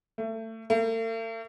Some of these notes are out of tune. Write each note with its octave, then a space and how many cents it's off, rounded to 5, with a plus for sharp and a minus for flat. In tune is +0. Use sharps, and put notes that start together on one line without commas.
A3 +25
A3 +45